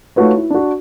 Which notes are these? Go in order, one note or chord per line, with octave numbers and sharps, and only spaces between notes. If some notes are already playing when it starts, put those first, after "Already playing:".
A3 D#4 F4 F#4 B4 C#5
E4
D4 F#4